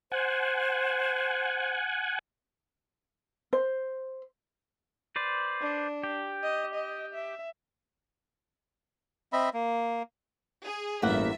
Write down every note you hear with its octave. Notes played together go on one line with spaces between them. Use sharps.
C5 F#5 G#5
C5
B4 C5 D5
D4
G4
D#5
D#5
E5
C4 D#5 E5 B5
A#3
G#4
A1 E2 G2 A#3 E5 F#5